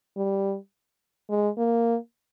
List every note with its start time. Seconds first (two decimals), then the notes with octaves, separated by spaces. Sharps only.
0.17 G3
1.30 G#3
1.58 A#3